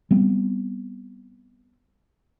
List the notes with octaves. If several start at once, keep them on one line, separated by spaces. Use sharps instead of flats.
G3 B3 C4